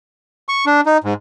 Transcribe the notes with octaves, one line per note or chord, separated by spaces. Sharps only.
C#6
D4
D#4
G#2